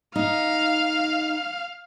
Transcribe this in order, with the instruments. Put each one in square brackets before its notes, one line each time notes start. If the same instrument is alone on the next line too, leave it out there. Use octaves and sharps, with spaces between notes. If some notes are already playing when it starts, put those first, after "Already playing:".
[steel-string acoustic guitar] D#4 [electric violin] F5